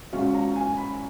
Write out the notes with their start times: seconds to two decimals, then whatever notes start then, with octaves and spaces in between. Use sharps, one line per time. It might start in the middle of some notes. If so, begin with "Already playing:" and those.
0.13 G#1 G#2 F#3 C#4 F4
0.34 A#5
0.56 G#5
0.77 B5